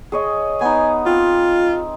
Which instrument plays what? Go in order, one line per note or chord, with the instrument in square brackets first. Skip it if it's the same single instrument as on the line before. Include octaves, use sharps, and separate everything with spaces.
[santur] G#4 C#5 D#5
[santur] B3 D#4 [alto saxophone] G#5
[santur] C4 [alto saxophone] F4